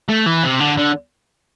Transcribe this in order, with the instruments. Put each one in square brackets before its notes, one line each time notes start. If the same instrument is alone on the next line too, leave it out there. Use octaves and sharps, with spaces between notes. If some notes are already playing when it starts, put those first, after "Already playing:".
[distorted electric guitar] A3
E3
C3
D3
D3